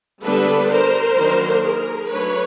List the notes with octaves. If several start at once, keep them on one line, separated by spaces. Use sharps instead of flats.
D3 G3 B3 D4 A4 B4
A#4 C5
D#3 F#3 A#3 D4
G#4 A#4
F#3 A3 D4 B4 C#5